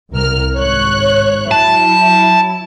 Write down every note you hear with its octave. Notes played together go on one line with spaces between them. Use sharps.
C2 A#4 F6
G#1 C#5 F#6
F#3 E4 A5